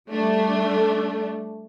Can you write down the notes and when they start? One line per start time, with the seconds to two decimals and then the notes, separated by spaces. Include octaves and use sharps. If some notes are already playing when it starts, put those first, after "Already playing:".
0.10 G3 A3 D4